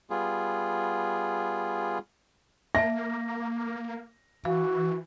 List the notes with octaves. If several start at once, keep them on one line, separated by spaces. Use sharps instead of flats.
G3 B3 F4 G#4
A#3 E5 A5 A#6
E3 F#4 F5